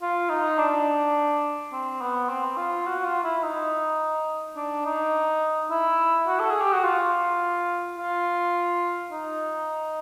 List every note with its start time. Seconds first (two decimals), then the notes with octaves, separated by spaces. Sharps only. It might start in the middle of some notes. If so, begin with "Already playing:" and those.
0.02 F4
0.30 D#4
0.59 D4
1.73 C4
2.01 B3
2.29 C4
2.57 F4
2.86 F#4
3.05 F4
3.24 E4
3.43 D#4
4.56 D4
4.85 D#4
5.71 E4
6.27 F#4
6.40 A4
6.50 G#4
6.62 G4
6.73 F#4
6.84 F4
7.98 F4
9.12 D#4